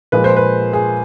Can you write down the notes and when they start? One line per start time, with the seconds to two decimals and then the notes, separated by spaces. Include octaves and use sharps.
0.12 A#2 F3 G#3 B4
0.24 C5
0.36 B4
0.73 G#4